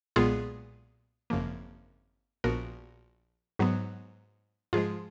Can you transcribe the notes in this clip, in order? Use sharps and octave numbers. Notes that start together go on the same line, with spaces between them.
B1 A#2 G#3 B3 F4 G#4
G#1 F#2 C#3 F3 A#3
A#1 A#2 F3 B3 F#4 A#4
G#2 F#3 B3
G#2 F3 G#3 F4 G#4